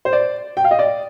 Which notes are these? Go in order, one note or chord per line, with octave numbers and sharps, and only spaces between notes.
C5
D5
G5
F5
D#5
D5